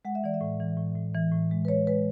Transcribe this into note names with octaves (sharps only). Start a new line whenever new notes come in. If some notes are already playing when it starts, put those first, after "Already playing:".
G#3 F#5
E5
E3 D5
E5
A2
E3
A2
A2
E3
A2
G#3
B4
G#3 C#5
G#3 B4